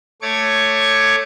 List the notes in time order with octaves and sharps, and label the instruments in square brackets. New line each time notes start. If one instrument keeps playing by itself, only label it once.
[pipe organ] A3 C#5 C#6 D6 G#6